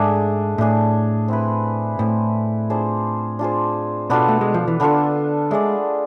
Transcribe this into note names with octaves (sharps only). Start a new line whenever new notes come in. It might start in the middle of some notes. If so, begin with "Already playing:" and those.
Already playing: G#2 A3 D4 G#4
A2 A3 D4 G#4
C4 E4 B4
A2 C4 E4 B4
D4 F4 G#4 C5
D4 F4 G#4 C5
B2 B3 D4 F4 A4
A3
G#3
F3
E3
D3 B3 D4 F4 A4
G#3 A3 D4 G#4 D5